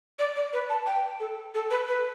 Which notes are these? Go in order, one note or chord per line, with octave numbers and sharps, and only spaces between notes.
D5
D5
B4
A5
G5
A4
A4
B4
B4